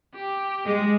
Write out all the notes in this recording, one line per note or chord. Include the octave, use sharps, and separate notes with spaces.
G4
G#3